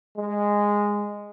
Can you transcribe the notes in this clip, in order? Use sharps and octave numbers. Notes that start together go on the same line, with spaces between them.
G#3